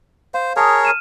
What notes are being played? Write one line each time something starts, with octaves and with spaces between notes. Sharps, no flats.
C5 F5
G#4 A#4 C#5 A5 D#6
F6 D#7 E7